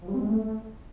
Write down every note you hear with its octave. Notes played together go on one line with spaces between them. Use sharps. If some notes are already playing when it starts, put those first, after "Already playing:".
F3
G3
C4
G#3
A3